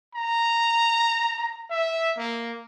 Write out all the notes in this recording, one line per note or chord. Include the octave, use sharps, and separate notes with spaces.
A#5
E5
A#3